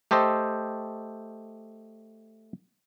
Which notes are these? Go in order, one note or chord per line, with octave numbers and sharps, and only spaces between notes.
A3 G4 A4 C5 D#5